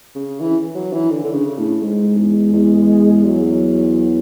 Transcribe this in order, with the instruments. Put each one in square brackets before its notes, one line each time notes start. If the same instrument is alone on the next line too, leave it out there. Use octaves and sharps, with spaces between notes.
[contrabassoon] C#3
E3
F#3
E3
D3
D3
C#3
A2
[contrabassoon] G#2 [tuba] G#3
[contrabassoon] E2
E2
[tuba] F#3